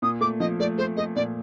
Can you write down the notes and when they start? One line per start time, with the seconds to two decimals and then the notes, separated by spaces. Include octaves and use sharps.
0.02 A#2 D#6
0.21 A3 D6
0.40 F3 D#5
0.60 A3 D5
0.78 A3 C5
0.97 A3 D#5
1.16 A#2 D5